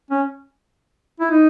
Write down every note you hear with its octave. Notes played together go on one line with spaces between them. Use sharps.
C#4
E4
D#4